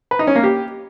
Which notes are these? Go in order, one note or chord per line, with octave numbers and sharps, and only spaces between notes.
B4
D#4
C#4
A#3
G4